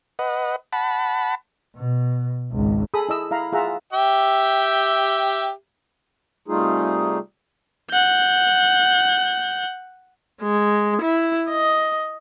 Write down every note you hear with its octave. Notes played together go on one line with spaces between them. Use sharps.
B4 D#5 F#5
F#5 A5 B5
B2
G#1 C#2
G#4 A4 B5 D#6
E4 D#5 E6
E4 F5 A#5 B5
F4 G#4 E5 F#5 A#5
G4 E5 G5
C3 G3 A3 D#4 F4 G#4
F#5 G6
G#3
E4
D#5